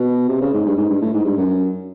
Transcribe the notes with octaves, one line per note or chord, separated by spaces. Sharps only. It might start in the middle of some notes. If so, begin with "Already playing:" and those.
Already playing: B2
C3
C#3
G#2
G2
G#2
G2
A2
G#2
G2
F#2